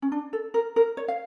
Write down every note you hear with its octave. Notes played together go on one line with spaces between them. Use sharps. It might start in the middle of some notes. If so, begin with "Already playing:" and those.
C#4
D4
A4
A#4
A#4
C#5
F5